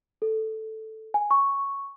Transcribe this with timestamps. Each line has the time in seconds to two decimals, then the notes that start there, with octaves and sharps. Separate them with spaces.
0.22 A4
1.14 G#5
1.31 C#6